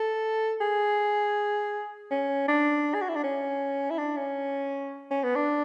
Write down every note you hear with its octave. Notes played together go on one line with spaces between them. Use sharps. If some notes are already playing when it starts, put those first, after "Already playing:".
Already playing: A4
G#4
C#4
D4
G#4
F#4
E4
D4
C#4
E4
D4
C#4
C#4
B3
D4